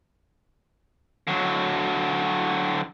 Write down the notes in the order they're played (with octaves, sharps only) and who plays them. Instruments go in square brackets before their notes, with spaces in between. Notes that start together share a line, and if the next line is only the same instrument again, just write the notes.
[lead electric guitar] D3 F#3